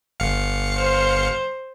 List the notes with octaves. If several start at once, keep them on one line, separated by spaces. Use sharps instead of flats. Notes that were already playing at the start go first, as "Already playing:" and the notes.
G1 F5 C#7
C5